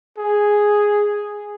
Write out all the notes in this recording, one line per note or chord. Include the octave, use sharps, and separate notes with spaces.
G#4